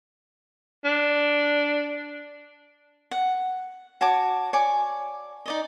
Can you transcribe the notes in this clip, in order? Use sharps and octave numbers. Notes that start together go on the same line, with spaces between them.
D4
F#5
F#4 C#5 A5 D6
C#5 D5 G#5 D6
D#4 D5 D#5